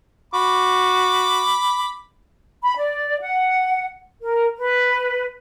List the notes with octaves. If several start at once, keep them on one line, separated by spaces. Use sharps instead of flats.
F#4 B5 D6
B5
D5
F#5
A#4
B4